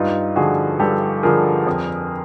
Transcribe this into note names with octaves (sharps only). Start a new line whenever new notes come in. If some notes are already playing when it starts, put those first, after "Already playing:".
Already playing: G2 D#4 F4
D3 F3 F#4 G#4
G2 G4 A4
D3 F3 G#4 A#4
F2